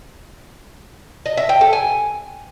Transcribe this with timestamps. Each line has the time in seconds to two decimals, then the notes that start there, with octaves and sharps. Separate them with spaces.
1.26 D#5
1.37 E5
1.49 G5
1.61 A4
1.73 G#5